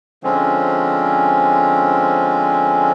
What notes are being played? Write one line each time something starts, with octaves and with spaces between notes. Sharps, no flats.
D3 F3 G#3 C4 C#4